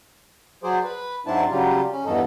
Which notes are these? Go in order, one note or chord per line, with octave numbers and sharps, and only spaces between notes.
F#3 G#4 C5 D5
B4
G#2 F#3 C4 D4 E4 A5
C#3 F#3 G3 F4 G4
C#4
E2 G2 B2 D#4 A4